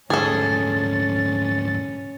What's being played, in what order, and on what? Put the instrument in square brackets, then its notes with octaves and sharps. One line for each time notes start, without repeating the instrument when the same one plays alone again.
[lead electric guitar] D2 G#2 [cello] C#4 [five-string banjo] G#4 A4 [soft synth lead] A6